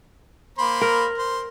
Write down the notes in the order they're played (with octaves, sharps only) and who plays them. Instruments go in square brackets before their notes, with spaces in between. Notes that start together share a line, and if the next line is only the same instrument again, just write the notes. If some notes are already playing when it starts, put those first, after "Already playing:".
[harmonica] A#3 C5 B5
[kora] A#4
[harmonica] C5